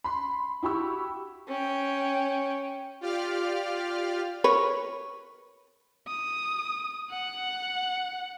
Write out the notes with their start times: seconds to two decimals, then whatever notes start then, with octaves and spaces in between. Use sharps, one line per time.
0.04 B5 C6
0.63 E4 F#4 G4 B5 C#6 E6
1.48 C#4 G5
3.01 F4 G4 D5 F5 F6
4.44 A#4 B4 C#5
6.08 D#6
7.10 F#5